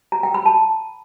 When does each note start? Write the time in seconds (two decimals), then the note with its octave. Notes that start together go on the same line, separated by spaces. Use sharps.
0.12 A#5
0.23 G5
0.34 B5
0.46 A5